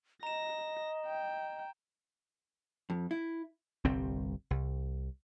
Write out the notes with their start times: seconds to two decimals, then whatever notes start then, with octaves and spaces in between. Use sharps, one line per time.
0.23 D#5 A#5 A#6 E7
1.06 G5
2.90 F2
3.11 E4
3.85 G1 C2 G3 C4
4.51 C2